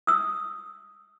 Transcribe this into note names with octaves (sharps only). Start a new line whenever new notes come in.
D#6 E6